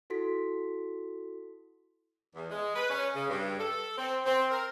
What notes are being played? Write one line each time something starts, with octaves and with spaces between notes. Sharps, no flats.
E4 F#4 A4 C6 B6
E2
G#3
B4
C#4
C#3
G2
A4
C4
C4
A#4